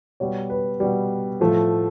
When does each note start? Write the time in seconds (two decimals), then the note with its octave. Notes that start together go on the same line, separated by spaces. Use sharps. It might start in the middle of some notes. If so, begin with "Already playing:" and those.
0.20 B2 G3 C#5
0.50 B4
0.80 B2 G3
1.40 A2 F3 A3